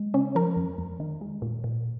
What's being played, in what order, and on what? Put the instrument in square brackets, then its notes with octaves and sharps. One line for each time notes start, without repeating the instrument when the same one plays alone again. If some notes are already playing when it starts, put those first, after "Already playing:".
Already playing: [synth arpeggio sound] G#3
C#3 C#4
F3 A#4
F2
F2
D#3
G#3
A#2
A#2